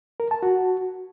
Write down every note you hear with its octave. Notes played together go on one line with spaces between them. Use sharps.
A#4
A5
F#4